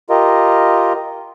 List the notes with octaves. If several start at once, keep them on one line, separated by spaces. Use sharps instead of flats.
F4 G4 A#4 D#5